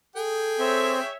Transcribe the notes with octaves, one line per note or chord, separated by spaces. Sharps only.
G#4 A4 G5
C4 C#5 E5